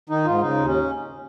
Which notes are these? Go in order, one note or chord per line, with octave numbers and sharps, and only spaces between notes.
D#3 D#4
G#2 F4
C#3 D#4
D#2
C#4